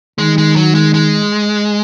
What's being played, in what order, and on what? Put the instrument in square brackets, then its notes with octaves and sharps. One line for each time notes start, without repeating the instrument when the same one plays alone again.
[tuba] D#3 [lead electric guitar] G#3
[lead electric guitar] G#3
F#3
G#3
G#3